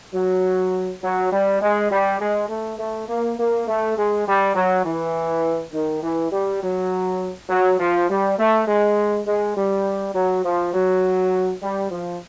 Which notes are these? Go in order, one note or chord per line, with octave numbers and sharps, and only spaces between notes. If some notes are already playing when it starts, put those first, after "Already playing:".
F#3
F#3
G3
G#3
G3
G#3
A3
A3
A#3
A#3
A3
G#3
G3
F#3
E3
D#3
E3
G3
F#3
F#3
F3
G3
A3
G#3
G#3
G3
F#3
F3
F#3
G3
F3